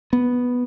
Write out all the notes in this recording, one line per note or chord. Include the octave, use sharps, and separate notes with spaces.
B3